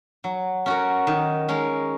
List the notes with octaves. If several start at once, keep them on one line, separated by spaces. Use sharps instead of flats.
F#3
C#4 F#4 A#4
D#3
G#3 C#4 A#4